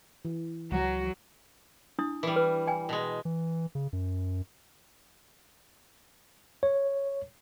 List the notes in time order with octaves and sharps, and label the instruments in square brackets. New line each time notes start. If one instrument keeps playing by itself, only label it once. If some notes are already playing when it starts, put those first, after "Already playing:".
[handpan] E3
[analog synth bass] C#2 [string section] F#3 [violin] F#4
[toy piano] D4 E4 D#6
[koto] E3 G3
[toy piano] B4
G5 G#5
[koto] B2 G#3
[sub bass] E3
C#3
F#2
[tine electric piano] C#5